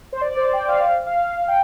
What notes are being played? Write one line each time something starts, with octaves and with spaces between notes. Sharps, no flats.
C5
D5
D5
C5
G5
F5
F5
F5
G5